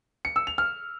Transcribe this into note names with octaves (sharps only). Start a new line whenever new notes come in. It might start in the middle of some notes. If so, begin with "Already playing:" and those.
C#7
E6
F7
F6